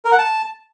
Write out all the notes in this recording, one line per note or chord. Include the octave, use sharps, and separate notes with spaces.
A#4
F#5
A5